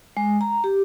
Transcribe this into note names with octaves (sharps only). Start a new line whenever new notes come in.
G#3
A#5
G4